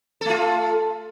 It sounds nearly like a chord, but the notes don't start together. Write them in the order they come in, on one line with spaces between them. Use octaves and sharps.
A4 A3 F4